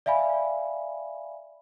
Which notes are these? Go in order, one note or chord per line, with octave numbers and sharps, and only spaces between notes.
D5 E5 F5 G#5 B5